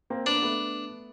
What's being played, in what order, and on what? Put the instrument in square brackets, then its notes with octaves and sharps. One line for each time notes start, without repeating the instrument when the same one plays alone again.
[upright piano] A#3 C4
[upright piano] B3 [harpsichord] D4
[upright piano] A#3
A3 B3